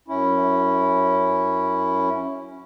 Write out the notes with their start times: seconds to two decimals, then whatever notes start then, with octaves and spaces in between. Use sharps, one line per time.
0.08 F#2 C#4 E4